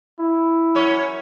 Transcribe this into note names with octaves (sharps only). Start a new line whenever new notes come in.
E4
F#2 C#4 C#5